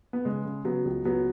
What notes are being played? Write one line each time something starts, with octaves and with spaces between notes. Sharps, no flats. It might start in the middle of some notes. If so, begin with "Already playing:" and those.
B3
C#3 G#3
C#3
C#3 F#3 B3
C#2
C#2 F#3 B3